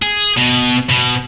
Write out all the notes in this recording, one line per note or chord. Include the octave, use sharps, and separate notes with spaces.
G#4
B2
B2